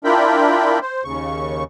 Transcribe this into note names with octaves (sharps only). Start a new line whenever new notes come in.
D4 E4 F4 A#4 G5 B5
C5
D#2 C#3 C#6